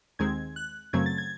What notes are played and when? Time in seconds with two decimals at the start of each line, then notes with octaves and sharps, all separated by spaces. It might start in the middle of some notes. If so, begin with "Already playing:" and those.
0.19 D#2 D#3 G#3 C4 G#6
0.56 F#6
0.93 F#2 C#3 F#3 A3 C4 G#6
1.06 A6
1.18 G#6